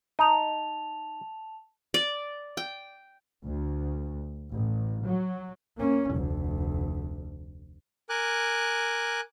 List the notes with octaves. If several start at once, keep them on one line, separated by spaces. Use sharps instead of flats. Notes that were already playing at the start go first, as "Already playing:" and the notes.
D#4 A5 F7
D5
G5
D2
A1
F#3
A#3 C#4
F1 D2
A#4 G#5 D6 F#6